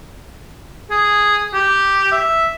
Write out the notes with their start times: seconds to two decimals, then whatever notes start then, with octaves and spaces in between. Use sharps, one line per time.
0.91 G#4
1.53 G4
2.12 E5